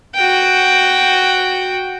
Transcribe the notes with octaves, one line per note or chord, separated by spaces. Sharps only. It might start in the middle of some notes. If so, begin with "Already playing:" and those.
F#4 G5